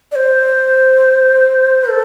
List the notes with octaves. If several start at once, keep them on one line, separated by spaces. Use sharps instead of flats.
D5
C5
A4